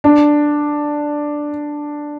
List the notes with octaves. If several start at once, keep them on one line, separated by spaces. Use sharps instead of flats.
D4